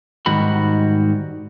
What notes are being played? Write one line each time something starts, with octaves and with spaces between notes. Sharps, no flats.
G#2 D#3 G3 F#4 B5